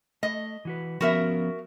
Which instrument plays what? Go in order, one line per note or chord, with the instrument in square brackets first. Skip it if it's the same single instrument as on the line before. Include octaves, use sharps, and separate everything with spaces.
[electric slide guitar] A3 [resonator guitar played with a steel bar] D#5
[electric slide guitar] E3 F#4 B4
[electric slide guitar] F3 B3 C#4 [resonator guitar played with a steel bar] F#4 A#4 E5